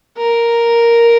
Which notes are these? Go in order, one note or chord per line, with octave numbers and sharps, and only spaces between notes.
A#4